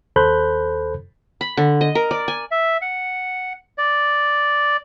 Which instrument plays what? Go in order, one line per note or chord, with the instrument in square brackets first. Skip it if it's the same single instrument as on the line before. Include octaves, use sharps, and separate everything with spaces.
[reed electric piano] D#2 A4 C5 B5 F#6 G6
[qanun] B5
D3
D#5
A#4
D5
G#5
[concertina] E5
F#5
D5